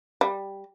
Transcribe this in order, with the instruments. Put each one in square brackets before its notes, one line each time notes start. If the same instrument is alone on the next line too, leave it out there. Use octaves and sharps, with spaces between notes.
[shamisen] G3